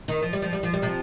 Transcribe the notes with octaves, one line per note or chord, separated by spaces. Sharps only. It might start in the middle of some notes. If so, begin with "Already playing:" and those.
D#3
F3
G3
F3
G3
F3
G3
C3 F3